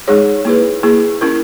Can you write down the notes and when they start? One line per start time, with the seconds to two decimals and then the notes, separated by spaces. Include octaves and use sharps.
0.08 G#3 D#4 G#4 C#5
0.45 A#3 E4 G#4 B4
0.83 A#3 E4 G#4
1.21 C#4 E4 A#4